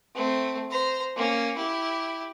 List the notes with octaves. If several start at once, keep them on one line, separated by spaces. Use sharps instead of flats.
A3 C4
C5 A#5
A#3 C#4
E4 G4